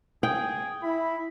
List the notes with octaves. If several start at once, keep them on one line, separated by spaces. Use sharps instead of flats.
G#4 G5
E4 B5